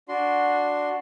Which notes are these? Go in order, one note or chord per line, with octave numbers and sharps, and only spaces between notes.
D4 F#4 C6